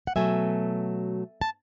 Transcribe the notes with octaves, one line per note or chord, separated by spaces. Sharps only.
F#5
B2 F#3 A3 E5 G#5
A5